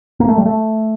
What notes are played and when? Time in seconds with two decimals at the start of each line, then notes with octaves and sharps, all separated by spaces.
0.20 A#3
0.29 A3
0.38 G3
0.46 A3